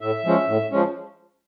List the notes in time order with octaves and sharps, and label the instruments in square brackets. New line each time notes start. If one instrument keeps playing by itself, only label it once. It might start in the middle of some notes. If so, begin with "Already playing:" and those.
[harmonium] A2 E5
F3 G#3 C#4
A2
F3 G#3 C#4